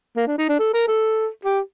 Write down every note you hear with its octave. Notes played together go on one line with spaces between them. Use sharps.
A#3
D4
D#4
D4
A4
A#4
A4
G4